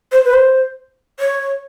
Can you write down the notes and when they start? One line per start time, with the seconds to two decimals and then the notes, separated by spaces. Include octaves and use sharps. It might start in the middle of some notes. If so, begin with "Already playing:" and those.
0.12 C5
0.25 B4
0.33 C5
1.19 C#5